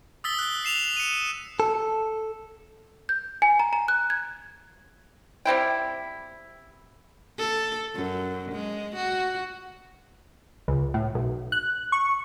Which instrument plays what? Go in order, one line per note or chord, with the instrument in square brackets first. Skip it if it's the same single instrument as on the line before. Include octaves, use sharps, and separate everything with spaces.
[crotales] D#6 E6 A6 B6 G7
F#6 G7
C7 E7 F7
C#7 D#7
[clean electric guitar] A4
[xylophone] G6
G#5
A#5
A#5
F#6
G#6
[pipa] G3 C4 E4 G5
[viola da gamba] A4
F#2
G#3
F#4
[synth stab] C#2
A2
B1
F#6
C#6